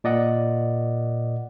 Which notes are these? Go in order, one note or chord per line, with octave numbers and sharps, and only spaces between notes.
A#2 D5 D#5 F#5